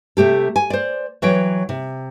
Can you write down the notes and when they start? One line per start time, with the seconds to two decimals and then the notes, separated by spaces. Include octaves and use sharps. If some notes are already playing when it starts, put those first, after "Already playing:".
0.17 C3 A3 G4 A4
0.56 G#5
0.70 C5 D5
1.22 E3 F#3 C#5 G5
1.69 C3